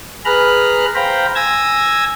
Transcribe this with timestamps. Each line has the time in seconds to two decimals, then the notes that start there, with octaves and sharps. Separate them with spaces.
0.25 G#4 B4 A#5 B5 F6 F#6
0.95 C5 F5 G5 A#5 B5
1.35 G#5 E6 G#6 A#6